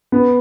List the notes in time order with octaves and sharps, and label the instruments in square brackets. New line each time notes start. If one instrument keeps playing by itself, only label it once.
[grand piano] B3